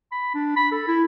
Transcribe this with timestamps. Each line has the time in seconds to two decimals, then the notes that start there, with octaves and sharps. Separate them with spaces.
0.12 B5
0.34 D4
0.56 B5
0.72 A4
0.87 E4